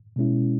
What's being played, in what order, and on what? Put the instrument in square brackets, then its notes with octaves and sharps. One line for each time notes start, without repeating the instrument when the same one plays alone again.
[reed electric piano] B2 G#3 C#4 E4